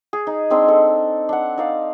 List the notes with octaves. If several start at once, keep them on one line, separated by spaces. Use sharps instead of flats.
G#4
D#4
G#3 C4 D4 D#4
A4
D4 F#5
D#4 D5 F5